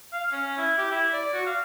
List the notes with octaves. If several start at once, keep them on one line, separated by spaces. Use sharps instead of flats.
F5
C#4
E4
G4
E4
D5
F#4
F5